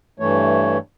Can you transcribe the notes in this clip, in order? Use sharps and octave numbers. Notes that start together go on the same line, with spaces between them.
G2 E3 A3 C#5